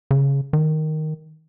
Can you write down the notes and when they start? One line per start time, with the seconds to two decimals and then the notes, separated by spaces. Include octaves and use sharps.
0.11 C#3
0.53 D#3